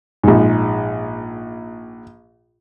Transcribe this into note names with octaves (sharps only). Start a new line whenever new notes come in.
A#1 G#2